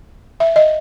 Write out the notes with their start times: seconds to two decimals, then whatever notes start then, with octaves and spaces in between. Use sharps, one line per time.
0.40 E5
0.56 D#5